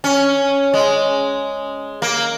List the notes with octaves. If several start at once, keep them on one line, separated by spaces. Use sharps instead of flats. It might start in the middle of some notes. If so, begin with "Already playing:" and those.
C#4
G#3
A#3